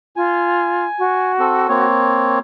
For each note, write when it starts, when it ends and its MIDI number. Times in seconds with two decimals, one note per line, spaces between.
0.16 0.86 65
0.16 1.32 80
0.99 1.85 66
1.39 1.67 60
1.39 1.67 69
1.69 2.39 58
1.69 2.39 60
1.69 2.39 73